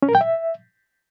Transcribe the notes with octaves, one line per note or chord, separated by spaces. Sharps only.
C#4
A#4
G5
E5